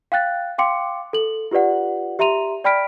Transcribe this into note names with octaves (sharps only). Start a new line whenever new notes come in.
F5 G5 F#6 A6
F5 G5 C6 D6 C#7
A4 F#7
F4 G4 B4 D5 F#5
G4 E5 A#5 C6 D#7 F7
D5 G5 B5 F6 B6 D7